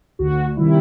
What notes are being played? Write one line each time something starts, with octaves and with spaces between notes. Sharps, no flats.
D2 F#4
C3 D#3 G3 E4